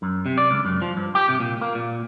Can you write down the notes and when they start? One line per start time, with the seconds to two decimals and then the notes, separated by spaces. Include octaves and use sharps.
0.02 F#2
0.26 C3
0.38 D5
0.51 C#2
0.65 F#2
0.82 F3
0.97 G2
1.15 G4
1.28 C3
1.40 A#2
1.61 A#3
1.75 A#2